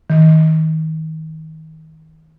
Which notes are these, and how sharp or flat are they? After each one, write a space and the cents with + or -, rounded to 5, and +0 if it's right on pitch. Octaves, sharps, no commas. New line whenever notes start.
D#3 +30